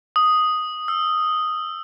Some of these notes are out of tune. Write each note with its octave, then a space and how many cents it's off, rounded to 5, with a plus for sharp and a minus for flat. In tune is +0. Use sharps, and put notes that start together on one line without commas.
D#6 +0
E6 +20